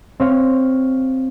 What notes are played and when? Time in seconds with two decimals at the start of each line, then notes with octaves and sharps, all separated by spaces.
0.20 C4 C#5 F5